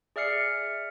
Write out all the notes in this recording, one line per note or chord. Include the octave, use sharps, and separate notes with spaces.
G#4 D5 E5 F6 C7 C#7